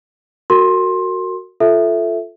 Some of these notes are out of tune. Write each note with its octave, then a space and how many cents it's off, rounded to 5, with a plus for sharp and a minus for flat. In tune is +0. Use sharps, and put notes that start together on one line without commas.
F#4 +0 A#4 -30 C6 +15
F4 +0 A4 +0 E5 +0